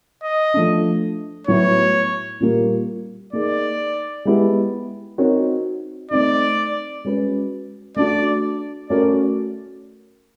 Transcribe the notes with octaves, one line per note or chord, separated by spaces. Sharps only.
D#5
F3 A3 D4
A2 F#3 B3 E4 C#5
A#2 G3 A#3
A#3 D#4 G#4 D5
G#3 B3 E4 G4
C4 D#4 F#4 A#4 C#5
A3 C4 D#4 D5
G#3 C#4 F#4 B4
A3 D4 F#4 D5
A3 C#4 F#4 A#4 D5